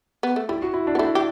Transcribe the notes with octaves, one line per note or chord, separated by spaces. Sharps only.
B3
A3
G3 E4
F#4
E4
D4
B3
A3 E4
G4